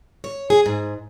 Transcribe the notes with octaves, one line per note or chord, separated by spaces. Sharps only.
C#5
G#4
G#2